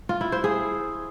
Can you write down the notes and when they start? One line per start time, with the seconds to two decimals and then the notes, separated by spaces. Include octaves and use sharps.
0.09 F4
0.21 E4
0.32 C5
0.44 G#4